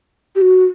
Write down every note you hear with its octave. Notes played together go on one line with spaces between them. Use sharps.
G4
F#4